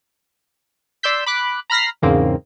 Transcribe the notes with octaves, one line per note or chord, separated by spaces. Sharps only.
D5 C6 E6 G6 B6
B5 D6 F#6
A#5 B5 F6 A#6 C7
E2 G#2 C#3 A#3 C4